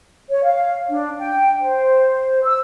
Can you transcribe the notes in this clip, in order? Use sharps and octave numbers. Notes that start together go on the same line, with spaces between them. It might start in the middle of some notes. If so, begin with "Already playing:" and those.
C#5
F5
D4
G5
C5
E6